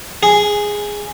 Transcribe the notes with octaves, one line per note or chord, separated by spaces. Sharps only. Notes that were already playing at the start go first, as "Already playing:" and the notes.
G#4